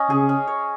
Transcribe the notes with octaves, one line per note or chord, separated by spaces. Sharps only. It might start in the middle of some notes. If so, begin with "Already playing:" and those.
Already playing: C#4 D#5
C#3 G#4
C#4
C#5